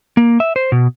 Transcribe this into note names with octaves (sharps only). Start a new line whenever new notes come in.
A#3
E5
C5
B2